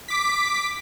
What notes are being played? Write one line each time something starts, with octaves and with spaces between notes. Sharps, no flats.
D6 B6